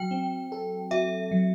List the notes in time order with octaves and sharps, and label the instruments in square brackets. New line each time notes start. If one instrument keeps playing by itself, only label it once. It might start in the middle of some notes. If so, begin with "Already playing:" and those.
Already playing: [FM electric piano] F#3 F#4 [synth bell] G5
[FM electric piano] C4
A4
[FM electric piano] F#4 [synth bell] E5
[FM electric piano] F#3